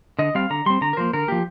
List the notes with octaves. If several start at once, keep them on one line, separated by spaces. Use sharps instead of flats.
D3 D#5
G3 C4 F5
D3 A#5
G3 C4 C6
D3 A#5
A#4
F3 A#3 C5
D3 A#4
F3 A#3 G4